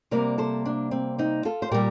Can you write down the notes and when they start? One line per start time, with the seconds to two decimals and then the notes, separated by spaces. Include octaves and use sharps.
0.11 C3 G3 A#3 A#4 D5
0.38 A4 C5
0.66 D4
0.91 C4
1.18 C4 D#4
1.45 F4 A4
1.62 C5
1.71 A#2 G3 G4 A#4